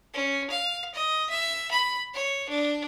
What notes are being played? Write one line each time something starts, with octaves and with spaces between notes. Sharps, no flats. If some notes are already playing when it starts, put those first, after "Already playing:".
C#4
F5
D#5
E5
B5
C#5
D4